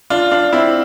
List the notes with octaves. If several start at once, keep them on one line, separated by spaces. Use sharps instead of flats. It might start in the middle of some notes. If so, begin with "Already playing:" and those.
D4 F4
D4 F4
C4 E4